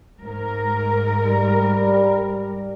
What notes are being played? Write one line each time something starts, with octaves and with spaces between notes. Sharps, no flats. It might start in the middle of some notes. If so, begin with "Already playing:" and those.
G#2 A#4
G3